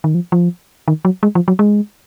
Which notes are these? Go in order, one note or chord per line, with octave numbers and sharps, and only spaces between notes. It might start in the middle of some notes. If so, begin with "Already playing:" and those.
D#3
F3
F3
D#3
F#3
G#3
F3
F#3
G#3